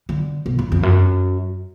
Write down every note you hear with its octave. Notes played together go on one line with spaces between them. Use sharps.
D3
B2
G#2
F2
F#2